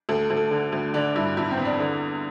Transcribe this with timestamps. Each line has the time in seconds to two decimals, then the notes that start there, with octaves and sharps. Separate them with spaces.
0.09 D2 A4
0.30 D2
0.37 A4
0.51 D3
0.72 D2
0.94 D3 D4
1.15 G2 E4
1.37 E2 E4
1.51 C4
1.57 E2
1.65 D4
1.80 D3